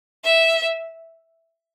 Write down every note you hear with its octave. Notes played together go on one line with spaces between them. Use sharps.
E5